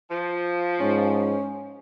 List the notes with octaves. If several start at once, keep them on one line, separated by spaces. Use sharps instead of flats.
F3
G#2 C#4